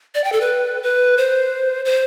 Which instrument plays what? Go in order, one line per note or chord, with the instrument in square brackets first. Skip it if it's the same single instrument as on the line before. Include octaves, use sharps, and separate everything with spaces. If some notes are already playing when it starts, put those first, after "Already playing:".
[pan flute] D5
G5
A4
B4
B4
C5
C5